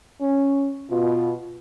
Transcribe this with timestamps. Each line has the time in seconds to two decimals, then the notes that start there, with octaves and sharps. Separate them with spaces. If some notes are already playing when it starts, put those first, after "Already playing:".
0.21 C#4
0.90 B2 F4